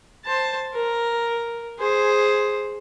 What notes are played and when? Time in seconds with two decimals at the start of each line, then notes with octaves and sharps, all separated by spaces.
0.25 C5 A5
0.74 A#4
1.79 G#4 C5